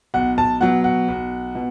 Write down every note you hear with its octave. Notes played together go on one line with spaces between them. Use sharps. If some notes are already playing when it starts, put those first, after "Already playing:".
B1 F#5
A5
B2 F#3 F#5
F#5
B1
B2